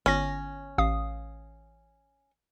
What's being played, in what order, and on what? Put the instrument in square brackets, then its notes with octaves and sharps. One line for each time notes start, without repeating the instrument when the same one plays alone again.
[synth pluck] G1 A#6 [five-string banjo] C#4
[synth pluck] A1 F5 D#6